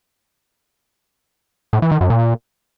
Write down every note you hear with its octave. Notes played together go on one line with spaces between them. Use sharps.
A2
E3
D#3
F#2
A#2